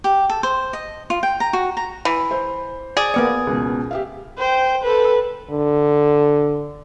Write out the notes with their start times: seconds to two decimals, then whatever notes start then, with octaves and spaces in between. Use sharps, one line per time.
0.04 G4
0.30 A4
0.43 C5
0.73 D#5
1.10 F4
1.23 G5
1.40 A#5
1.53 F#4
1.77 A#5
2.05 E3
2.31 C5
2.97 G#4 D5
3.14 A#3 B3 D5
3.47 C#2 B2
3.91 G4 E5 F5
4.38 C5 G5
4.84 A4 B4
5.50 D3